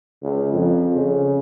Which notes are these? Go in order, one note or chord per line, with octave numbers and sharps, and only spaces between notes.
C#2
F2
C#3